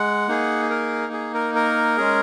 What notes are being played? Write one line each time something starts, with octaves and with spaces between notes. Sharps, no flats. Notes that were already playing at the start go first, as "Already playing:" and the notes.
Already playing: G#3 F#5
A#3 D#4 G#4
A#4
G#4
A#4
A#4
G#3 C#4 G#4